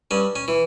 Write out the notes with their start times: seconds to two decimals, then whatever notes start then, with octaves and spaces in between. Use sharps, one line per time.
0.11 G2 C#4
0.36 C#4
0.48 E3